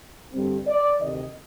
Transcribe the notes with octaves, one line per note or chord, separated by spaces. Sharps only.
G2 D3 G3 C4
D5
D2 C3 D#3 D#5